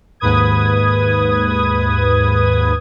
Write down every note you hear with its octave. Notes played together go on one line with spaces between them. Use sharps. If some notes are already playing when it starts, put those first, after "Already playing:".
D#2 G#2 B4 D#6 G#6